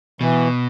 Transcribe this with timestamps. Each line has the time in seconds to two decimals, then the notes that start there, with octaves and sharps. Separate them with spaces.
0.21 B2 E3